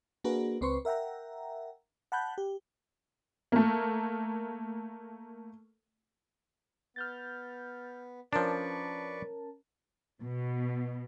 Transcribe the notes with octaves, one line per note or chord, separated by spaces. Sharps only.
A#3 D4 F#4 G#4 A#4 B4
C#2 C4 B4 C6 C#6
A#4 E5 F#5 G5 A#5
F#5 A5 B5 F#6 G6
G4
A3 A#3
B3 F6 G6 A6
F3 C#4 D4 A#4 B4 D5 A5 C#6
B2